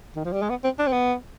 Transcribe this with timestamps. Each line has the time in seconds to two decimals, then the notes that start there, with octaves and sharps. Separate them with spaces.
0.16 D#3
0.25 F3
0.33 G3
0.42 G#3
0.50 B3
0.64 C4
0.79 D4
0.87 C4
0.93 B3